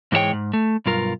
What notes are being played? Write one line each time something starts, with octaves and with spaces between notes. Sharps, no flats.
G#2 E3 G#3 F#4 C#5 G5
G#2
A3
B1 G2 F4 A#4